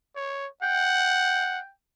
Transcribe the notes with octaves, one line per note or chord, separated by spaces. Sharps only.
C#5
F#5 G5